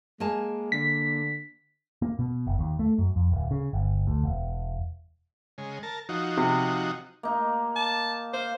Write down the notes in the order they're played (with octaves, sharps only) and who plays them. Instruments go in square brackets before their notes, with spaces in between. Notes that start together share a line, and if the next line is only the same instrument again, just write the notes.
[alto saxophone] G#3 [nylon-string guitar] A#3 G#5 A5
[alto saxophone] D3 [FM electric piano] B6
[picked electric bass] A#3
B2
F#1
D#2
A3
F#2
F2
D1
C#3
G1
D2
E1
[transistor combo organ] C#3 G#3
A#4 A5
F3 D#4 F#4
[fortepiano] C3
[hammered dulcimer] A#3 D#4
[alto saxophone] A5
[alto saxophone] C5 [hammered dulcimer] F5